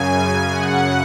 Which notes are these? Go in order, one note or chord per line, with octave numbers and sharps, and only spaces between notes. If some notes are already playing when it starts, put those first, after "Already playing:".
Already playing: F#2 C#3 G#5
F#5